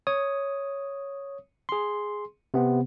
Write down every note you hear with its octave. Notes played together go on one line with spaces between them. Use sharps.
C#5 D#6
G#4 C6
C3 B3 C4